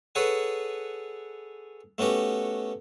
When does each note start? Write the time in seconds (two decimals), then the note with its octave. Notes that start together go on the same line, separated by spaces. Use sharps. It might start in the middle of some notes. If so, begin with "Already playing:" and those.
0.15 G#4 A4 B4 C#5 F#5 G#5
1.98 A3 B3 C#4 F#4 G4